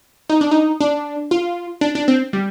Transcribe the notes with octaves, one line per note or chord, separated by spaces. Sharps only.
D#4
D4
D#4
D4
F4
D4
D4
C4
G3